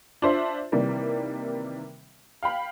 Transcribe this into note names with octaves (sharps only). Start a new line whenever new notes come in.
D4 F4 C5 E5
C3 D#3 E3 G3 A#3
F5 G5 B5